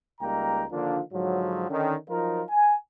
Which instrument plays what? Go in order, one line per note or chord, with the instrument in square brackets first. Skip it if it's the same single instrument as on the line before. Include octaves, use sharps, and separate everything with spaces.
[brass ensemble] C#2 G3 A#3 D#4 G5 A#5
D3 D#3 F3 A#3 D4 F4
G#2 D3 F3 F#3
D3 D#3 C#4
F3 F#3 D#4 F4 A#4
G#5